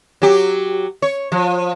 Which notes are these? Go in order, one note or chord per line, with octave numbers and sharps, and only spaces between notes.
F#3 G4
C#5
F3